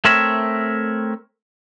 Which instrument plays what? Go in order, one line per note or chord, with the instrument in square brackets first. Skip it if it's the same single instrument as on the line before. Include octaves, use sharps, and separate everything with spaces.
[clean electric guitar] A3 C4 A#4 C#5 E5